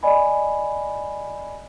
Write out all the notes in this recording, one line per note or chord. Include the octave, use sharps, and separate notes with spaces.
D5 D#5 G#5 B5